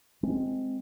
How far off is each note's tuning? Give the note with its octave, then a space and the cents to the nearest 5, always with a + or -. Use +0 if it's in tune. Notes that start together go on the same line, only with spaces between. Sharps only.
G#3 +0 C4 -10